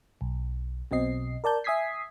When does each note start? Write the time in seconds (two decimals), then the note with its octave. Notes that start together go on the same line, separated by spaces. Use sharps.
0.21 B1
0.91 B1 B2 C4 D#5 C7
1.44 A#4 D5 A5 G6
1.64 E5 G#5 D#6 G#6 B6 C7